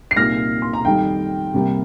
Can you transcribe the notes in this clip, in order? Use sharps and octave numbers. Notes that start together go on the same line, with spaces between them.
C7
C2 A#2 A#3 D#4 F6 A#6
C6
A#5
F2 D#3 G3 D#4 G5
C2 C3 G3 A#3